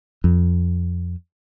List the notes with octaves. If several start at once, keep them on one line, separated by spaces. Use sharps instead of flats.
F2